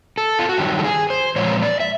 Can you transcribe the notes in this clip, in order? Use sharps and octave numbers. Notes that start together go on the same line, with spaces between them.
A4
F4
F#4
G2 D#3 F#3 G4
A4
G#4
C5
A#2 F3 G#3 C#5
D5
E5